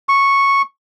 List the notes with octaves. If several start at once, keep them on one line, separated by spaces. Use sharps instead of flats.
C#6